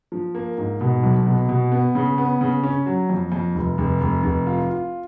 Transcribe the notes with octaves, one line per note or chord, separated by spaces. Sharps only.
F3
A#3
G#2
B2
B1
B2
B2
B3
C#3
B3
C#3
C#4
F#3
F2
F2
F1
F1
F1
F1
F4
F4